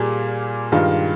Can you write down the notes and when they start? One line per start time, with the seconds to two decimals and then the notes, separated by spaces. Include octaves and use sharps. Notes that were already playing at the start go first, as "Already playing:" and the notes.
Already playing: A#2 G3 A#3 G#4
0.72 G2 D#3 G#3 F4